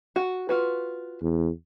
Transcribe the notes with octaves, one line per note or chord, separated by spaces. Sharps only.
F#4
F4 F#4 B4
E2